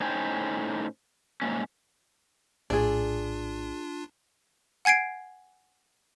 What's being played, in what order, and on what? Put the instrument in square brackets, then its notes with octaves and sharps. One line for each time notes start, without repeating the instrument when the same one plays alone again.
[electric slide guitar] A2 C#4 D#4 C5 G5 G#5
G#2 A#3 C#4
[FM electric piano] A#1 A2 [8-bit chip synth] D4 F4 [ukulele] G#4 D5
[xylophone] F#5 G#5 G#6 C7 D7